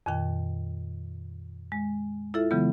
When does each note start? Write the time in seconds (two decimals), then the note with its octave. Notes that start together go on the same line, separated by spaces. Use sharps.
0.06 F2 A#2 D#3 G5
1.72 G#3
2.34 E4 F4 A4 E5
2.51 C#3 E3 F#3 G#3 B3